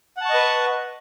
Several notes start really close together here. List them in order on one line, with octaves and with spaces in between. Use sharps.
F#5 A5 C#6 D#5 B4